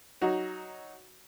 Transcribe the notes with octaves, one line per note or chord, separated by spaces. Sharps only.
F#3 D#4 F#4